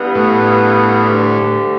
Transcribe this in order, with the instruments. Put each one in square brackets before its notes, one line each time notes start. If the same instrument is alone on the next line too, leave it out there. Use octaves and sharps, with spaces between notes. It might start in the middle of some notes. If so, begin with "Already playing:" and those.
Already playing: [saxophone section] G2 E3 B3
[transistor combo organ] A2
[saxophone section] D2 D3 G3